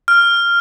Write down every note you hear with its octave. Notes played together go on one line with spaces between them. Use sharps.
F6